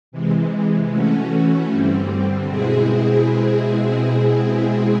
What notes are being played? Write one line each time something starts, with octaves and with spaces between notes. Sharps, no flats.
C3 E3 G#3
E3 A3 C#4 F#4
G2 D3 G3 C4
B2 G#3 C4 E4 G#4